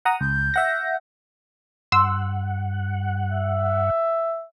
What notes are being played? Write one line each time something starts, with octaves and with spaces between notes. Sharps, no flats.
F#5 A#5 D#6
C#2 G6
E5 F#5 A#6
G2 F#5 C6 E6
E5